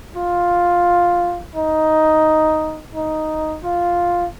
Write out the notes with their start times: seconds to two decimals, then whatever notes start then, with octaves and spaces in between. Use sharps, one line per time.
0.16 F4
1.55 D#4
2.95 D#4
3.63 F4